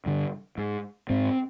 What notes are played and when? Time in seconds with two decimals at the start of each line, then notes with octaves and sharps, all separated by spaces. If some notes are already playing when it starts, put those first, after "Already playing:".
0.06 G2 D3
0.58 G#2
1.10 G#2 C4